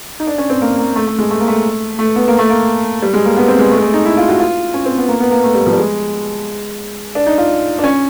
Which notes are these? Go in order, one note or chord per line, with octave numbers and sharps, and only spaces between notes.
D#4
D4
C#4
C4
A#3
A#3
A3
A3
G#3
A3
A#3
A3
A3
B3
A#3
A3
A#3
G3
G#3
A#3
B3
C4
G#3
A3
G#3
A3
D#4
E4
F4
F#4
F4
C#4
C4
B3
A#3
B3
A#3
A3
G3
F3
G3
G#3
D4
D#4
F4
D4
C#4